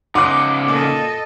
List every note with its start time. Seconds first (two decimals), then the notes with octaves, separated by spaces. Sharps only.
0.15 C#3 D#4 F#5 C6 D6 D#6 F#6
0.68 A#2 A4 D#5